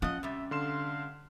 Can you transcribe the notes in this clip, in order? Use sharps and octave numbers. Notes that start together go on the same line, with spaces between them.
F3 C#4 D#5 F#5
C3 G3 E5
D3 F5 C6 E7